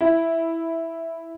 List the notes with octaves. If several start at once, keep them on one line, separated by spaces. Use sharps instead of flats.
E4